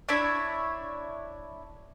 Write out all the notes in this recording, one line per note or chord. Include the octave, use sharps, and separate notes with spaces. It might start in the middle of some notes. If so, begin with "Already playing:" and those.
D4 E4 C#5 B5